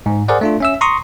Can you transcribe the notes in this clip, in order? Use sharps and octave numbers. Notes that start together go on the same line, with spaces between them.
G#2
G#4 A#4 C5 D5 F#5
A3 D4 F4
C#4 E5 E6
A#5 C6 C#6 D#6